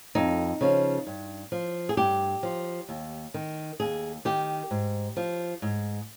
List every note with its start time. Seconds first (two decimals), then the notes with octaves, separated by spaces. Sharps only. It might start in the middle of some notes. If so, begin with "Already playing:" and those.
0.15 F2 D#4
0.61 C#3 F3
1.07 G2
1.52 F3
1.89 G#4
1.97 G2 G4
2.43 F3
2.89 D#2
3.34 D#3
3.80 D#2 G#4
4.25 D#3 G4
4.71 G#2
5.17 F3
5.62 G#2